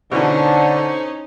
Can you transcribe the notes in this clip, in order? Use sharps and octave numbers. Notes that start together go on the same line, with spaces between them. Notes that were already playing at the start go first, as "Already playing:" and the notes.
B2 D3 E3 C#4 D#4 C5 C#6